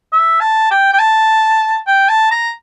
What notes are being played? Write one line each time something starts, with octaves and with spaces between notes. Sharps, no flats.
E5
A5
G5
G5
A5
G5
A5
A#5